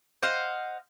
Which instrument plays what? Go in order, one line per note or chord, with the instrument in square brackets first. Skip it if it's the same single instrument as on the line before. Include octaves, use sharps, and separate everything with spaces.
[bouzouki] C5 D#5 F5 F#5